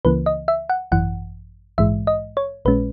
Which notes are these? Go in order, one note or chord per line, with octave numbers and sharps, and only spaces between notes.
C#2 C#3 E3 A#3 B4
D#5
E5
F#5
G#1 F#2 E3 F#5
A#1 G#2 E3 G#3 E5
D#5
C#5
A#1 A#2 G#3 C#4 B4